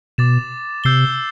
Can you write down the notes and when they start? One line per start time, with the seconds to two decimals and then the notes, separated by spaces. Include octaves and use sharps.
0.18 B2 D6 A6 E7
0.84 C3 E6 G6 C7 G7